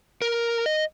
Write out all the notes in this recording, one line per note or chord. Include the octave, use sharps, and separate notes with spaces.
A#4
D#5